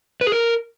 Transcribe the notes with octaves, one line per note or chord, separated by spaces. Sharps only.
B4
G#4
A#4